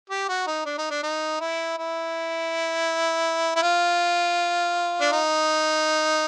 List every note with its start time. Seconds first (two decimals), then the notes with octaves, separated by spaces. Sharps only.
0.10 G4
0.29 F#4
0.47 D#4
0.66 D4
0.78 D#4
0.91 D4
1.03 D#4
1.40 E4
1.78 E4
3.56 E4
3.63 F4
5.01 D4
5.13 D#4